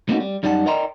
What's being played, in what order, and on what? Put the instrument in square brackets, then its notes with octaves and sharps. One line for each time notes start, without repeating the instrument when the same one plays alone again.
[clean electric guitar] A3 A#3 C4 C#4 D#4 F#4
G3
F#2 G3 D#4 D5 F#5 A5
A#4 D5 D#5 G5 A#5 C6